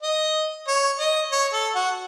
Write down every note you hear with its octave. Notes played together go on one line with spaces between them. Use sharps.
D#5
C#5
D#5
C#5
A4
F#4